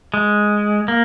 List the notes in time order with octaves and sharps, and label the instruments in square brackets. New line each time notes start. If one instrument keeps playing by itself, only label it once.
[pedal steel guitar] G#3
A#3